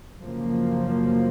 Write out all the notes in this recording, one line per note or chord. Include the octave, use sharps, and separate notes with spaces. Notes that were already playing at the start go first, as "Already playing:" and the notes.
F#2 C#3 F3 A#3